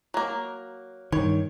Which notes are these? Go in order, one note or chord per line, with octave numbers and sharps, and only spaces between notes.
F#3 A#3
G2 D#3 C#5